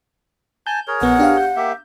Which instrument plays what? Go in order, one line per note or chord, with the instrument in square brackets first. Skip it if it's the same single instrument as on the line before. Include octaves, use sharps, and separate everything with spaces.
[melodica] G#5 A5 [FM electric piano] G6
[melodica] G#4 A#4 C#5
[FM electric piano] A#1 B3 [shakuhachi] F#5
[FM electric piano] D4 G4 F5
G6
[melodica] A#3 G4 E5